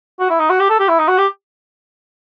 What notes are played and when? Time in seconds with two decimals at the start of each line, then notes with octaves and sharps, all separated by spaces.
0.20 F#4
0.30 E4
0.40 D#4
0.50 F#4
0.60 G4
0.70 A4
0.80 G4
0.89 E4
0.99 D#4
1.08 F#4
1.18 G4